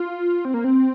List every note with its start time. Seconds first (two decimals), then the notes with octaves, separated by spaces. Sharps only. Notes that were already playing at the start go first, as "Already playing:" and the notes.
Already playing: F4
0.45 C4
0.54 A#3
0.64 C4